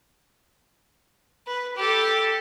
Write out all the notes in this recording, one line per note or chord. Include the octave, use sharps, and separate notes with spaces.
B4
G4 A4